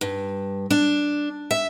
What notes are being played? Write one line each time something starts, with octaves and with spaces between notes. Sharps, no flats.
G2
D4
E5